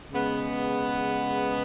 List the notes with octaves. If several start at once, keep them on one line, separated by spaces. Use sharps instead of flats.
C#3 G#3 B3